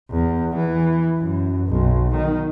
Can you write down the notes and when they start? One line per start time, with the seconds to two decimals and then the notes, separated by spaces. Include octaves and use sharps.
0.11 E2
0.56 E3
1.19 F#2
1.68 B1
2.15 D#3